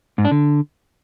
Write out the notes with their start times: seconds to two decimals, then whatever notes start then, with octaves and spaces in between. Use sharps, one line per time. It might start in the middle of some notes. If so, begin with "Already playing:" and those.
0.18 G#2
0.25 D4
0.31 D3